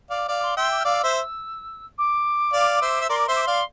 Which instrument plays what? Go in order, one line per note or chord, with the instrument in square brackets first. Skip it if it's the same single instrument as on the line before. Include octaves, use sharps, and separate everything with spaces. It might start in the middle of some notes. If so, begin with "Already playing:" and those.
[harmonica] D5 F5
[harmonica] D5 F5 [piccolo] D6
[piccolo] C6
[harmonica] E5 G5 [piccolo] C6
[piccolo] D6
F6
[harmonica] D5 F5 [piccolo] E6
[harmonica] C5 E5
[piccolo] D6
[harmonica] D5 F5
C5 E5
E5
[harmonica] A#4 D5 [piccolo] C6
[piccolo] D6
[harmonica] C5 E5 [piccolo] C6
[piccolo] D6
[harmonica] D5 F5 [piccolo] C6